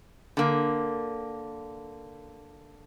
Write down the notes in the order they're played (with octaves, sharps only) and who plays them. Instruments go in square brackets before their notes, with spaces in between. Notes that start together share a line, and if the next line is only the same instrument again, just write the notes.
[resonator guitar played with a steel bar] D3 A#3